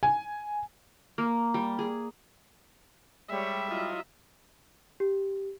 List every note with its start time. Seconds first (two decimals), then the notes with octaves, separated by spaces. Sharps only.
0.03 G#5
1.18 A#3
1.54 G3
1.79 G#4
3.30 G3 G#3 C#5 E5
3.71 F#3 E4 F4 D#5
5.00 G4